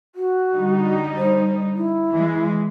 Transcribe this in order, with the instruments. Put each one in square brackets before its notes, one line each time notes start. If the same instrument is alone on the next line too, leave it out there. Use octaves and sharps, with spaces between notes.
[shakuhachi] F#4
[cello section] D3 G3 D#4
[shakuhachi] C5
E4
[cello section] E3 G#3